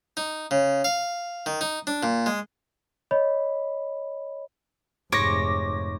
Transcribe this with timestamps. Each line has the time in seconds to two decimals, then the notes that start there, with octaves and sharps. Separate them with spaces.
0.17 D#4
0.51 C#3
0.84 F5
1.46 D#3
1.61 D#4
1.87 D4
2.03 A#2
2.26 G#3
3.11 C#5 D#5 B5
5.12 F1 G#2 C#5 D6 A#6